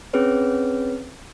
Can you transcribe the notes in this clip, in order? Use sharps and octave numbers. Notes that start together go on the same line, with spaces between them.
C4 C#4 G#4 B4 C#5